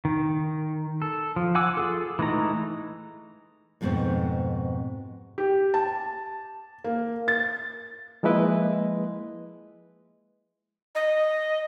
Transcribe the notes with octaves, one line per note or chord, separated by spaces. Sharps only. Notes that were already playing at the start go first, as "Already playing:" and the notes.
D#3
A4
F3
F#5 G#5 D6 E6
F4 G#4 A4
E3 G#3 A3 D#4 A#5
F2 G#2 B2 G#3 A3 C4
G4
A5
A#3
A6
F3 G#3 A#3 E4 B4 D#5
D#5